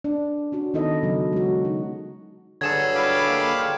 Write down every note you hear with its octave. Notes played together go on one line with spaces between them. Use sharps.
D4
C#4 D4 F#4
D#3 B3 D#4 E4 A4 D#5
C#3 F#3 A4
G#3 F#4
D#4
G2 D3 F#3 G#4 A4 G#6 E7
G3 E4 C#5 F5 B5 D6
A#3 D#5
A#4 G5 C6